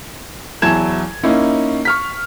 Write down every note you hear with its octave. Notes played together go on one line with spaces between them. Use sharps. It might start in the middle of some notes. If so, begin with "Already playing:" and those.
E2 F#3 E4 A5 G#6 E7
A#3 C#4 D#4 E4
C#6 F6 B6